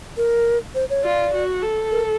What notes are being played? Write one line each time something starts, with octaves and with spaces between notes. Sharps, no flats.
A#4
C5
C#5
F4 D5
F#4
A4
A#4